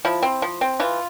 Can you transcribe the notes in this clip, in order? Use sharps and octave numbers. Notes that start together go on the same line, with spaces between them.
F3 E4
C4
F3
C4
E3 F4